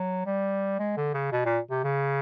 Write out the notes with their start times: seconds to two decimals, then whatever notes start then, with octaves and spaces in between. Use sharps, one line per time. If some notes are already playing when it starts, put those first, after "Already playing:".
Already playing: F#3
0.26 G3
0.79 G#3
0.97 D3
1.14 C#3
1.32 B2
1.45 A#2
1.71 C3
1.84 C#3